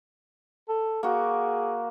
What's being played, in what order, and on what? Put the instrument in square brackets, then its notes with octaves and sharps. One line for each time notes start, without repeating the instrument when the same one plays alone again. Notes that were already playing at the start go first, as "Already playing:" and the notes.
[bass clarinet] A4
[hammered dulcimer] A#3 F#4 [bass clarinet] G#4